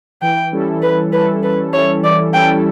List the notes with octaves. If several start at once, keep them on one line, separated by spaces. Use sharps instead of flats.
E3 G5
G3 C#4 E4 A4
E3 B4
G3 C#4 E4 A4 B4
E3 B4
G3 C#4 E4 A4 C#5
E3 D5
G3 C#4 E4 A4 G5